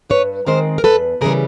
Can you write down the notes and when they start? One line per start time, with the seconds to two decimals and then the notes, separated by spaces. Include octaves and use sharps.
0.10 G2 B4 C#5
0.46 D#3 G#3 C4 A#4 C5
0.78 A#4
0.84 E2 A4 B4
1.21 C#3 E3 G3 G#4 A#4